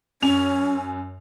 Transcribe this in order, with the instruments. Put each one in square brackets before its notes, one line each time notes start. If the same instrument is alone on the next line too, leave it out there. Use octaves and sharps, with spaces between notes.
[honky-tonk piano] F#2 G#5 F7 [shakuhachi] C#4